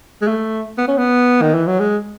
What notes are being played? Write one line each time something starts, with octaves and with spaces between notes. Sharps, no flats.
G#3
A3
B3
C#4
B3
D#3
E3
F#3
G#3